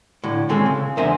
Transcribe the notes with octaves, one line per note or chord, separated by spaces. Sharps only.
A2 D3
D#3 G#3 C4 C#4 A4 G#5
C#3
E2 D3 A#4 C5 E5 G#5